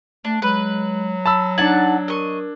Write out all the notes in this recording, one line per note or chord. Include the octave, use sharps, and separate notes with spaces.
A3 D4
F#3 G#3 B4
A5 B5 E6
D4 D#4 F#5 A5 G#6
A#4 D#5 C#6